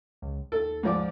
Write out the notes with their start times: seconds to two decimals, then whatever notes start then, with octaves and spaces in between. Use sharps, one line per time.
0.22 C#2
0.52 D#2 A4
0.83 G#2 F3 D5